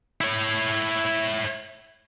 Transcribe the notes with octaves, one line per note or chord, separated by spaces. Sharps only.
E4 C#5